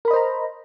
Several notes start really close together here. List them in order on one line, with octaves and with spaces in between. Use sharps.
A#4 B5 D#5 C5 A#5